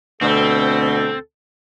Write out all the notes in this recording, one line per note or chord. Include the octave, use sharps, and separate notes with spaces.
D2 B2 C4 A4